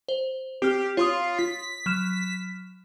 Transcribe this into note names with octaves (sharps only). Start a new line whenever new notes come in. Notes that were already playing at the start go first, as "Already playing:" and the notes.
C5
C4 G4 F6
F4 C#5 C6 D#6
B6
F#3 F6 E7